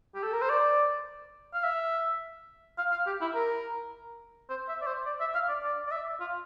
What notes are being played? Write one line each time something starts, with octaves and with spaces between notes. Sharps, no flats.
G4
A4
A#4
C5
D5
F5
E5
F5
F5
G4
E4
A#4
C5
E5
D5
C5
D5
E5
F5
D5
D5
D5
E5
F4